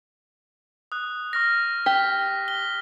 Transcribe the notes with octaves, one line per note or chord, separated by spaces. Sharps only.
D#6 F#6
C#6 F6 A#6
G4 B6
G7